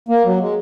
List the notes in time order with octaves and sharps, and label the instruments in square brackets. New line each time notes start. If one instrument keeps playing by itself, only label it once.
[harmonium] A#3
F#3
G#3